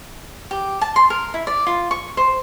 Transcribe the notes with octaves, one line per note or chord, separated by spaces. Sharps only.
G4
A5
C6
A#4
E4
D5
F4
C#6
C5